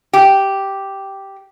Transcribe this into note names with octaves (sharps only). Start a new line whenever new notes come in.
G4